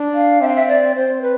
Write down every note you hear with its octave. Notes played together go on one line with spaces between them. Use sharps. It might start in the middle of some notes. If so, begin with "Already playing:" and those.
Already playing: D4
F5
C4 E5
F5
E5
D5
C4 C5
B4